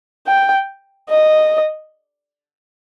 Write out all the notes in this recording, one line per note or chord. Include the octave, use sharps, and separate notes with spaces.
G5
D#5